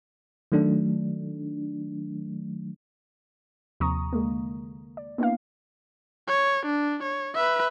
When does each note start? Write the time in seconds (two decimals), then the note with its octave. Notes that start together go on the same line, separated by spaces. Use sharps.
0.52 D#3 F#3 A3 D4
3.80 D#2 C3 F3 A#5 C#6 D#6
4.13 D3 G#3 A#3
4.97 D5
5.18 A#3 B3 D4 E4 F5
6.28 C#5
6.65 D4
7.03 C#5
7.35 B4 E5